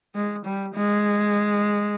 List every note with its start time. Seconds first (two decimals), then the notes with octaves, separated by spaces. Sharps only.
0.15 G#3
0.44 G3
0.74 G#3